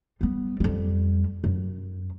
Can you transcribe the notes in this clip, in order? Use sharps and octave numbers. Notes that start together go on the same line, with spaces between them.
G3 B3
F2 G3
F#2